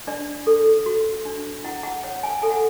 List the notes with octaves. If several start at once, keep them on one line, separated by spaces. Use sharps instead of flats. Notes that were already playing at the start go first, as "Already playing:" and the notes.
D4 D5
A4
F#4
D4
E4 F#5
F#5
C#5 F#5
G#5
A4 G#5
F#5